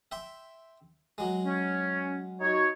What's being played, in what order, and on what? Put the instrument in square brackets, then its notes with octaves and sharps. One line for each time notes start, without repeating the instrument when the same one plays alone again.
[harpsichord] E5 G5 C6
F#3 G#3
[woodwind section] C#4
D#4 F#4 C#5